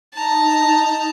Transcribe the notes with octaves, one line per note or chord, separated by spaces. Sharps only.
D#4 A5 A#5